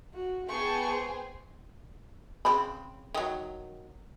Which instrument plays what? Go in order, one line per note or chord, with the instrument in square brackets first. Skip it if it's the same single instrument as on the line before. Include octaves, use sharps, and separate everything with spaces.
[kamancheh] F#4
[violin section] B3 G#4 G5 [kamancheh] A5 C#6
[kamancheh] C5
[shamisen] C#3 C4 B5
D#3 F#3